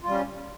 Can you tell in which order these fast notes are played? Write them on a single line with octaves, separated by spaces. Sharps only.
F4 G3 C#4